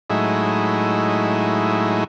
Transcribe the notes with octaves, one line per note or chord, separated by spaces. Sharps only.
A2 F#3 G#3 D#4 E4